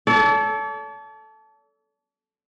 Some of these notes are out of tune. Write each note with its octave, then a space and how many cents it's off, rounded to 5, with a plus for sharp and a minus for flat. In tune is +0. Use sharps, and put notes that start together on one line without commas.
A4 -10 D5 -45